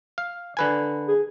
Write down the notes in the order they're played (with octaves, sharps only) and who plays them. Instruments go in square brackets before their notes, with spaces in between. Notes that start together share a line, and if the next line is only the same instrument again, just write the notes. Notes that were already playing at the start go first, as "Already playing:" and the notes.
[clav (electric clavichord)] F5
D3 B4 G#5
[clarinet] G#4